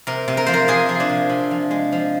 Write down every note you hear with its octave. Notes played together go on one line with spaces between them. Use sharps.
C3 A#4
C3
A#4
F3 C5
A#4
C3 G#4
F3
D4
C3
C3
F3
G#3
F3